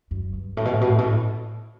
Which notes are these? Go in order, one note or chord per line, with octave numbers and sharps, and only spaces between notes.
F#2
G2
A2
B2
A2
B2
A2
B2
A2